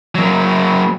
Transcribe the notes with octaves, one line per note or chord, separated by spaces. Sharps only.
F#3 A#3